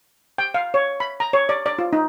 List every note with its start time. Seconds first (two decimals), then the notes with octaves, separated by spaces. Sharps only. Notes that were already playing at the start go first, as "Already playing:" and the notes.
0.38 G5
0.54 F5
0.74 C#5
1.00 B5
1.20 A#5
1.33 C#5
1.49 D5
1.66 D5
1.79 F4
1.93 D#4